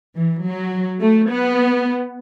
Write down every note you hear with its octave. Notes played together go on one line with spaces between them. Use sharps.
E3
F#3
A3
B3